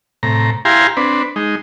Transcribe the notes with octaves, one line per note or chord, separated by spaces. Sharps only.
A2 C3 A#5
E4 G4 F5 G#5 A#5 C6
C4 D4 B4
G#3 D#4